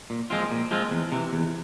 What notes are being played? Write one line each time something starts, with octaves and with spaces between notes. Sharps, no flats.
A#2
F3 G#3 C4 F4
A#2
F3 G#3 C4 F4
E2
C3 E3
E2